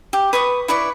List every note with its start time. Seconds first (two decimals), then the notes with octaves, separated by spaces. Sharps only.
0.13 G4
0.33 B4 C#6 D#6
0.68 E4 B4 D5 C#6